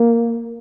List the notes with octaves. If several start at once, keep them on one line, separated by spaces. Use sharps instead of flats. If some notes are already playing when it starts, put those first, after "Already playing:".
Already playing: A#3